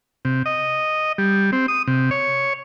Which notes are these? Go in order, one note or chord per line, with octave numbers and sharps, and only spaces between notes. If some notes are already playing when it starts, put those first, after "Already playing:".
C3
D#5
G3
C4
D#6
C3
C#5